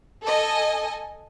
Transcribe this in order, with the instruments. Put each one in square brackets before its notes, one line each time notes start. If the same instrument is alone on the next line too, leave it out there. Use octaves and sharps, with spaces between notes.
[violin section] A4 D#5 G#5